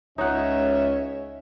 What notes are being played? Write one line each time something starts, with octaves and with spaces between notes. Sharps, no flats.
C#2 C#4 D#4 C#5 E5 F#5